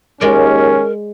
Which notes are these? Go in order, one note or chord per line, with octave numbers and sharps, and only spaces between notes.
D#2 G#3 C#4 A#4 D5